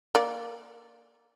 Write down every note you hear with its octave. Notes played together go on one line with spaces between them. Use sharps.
A#3 D5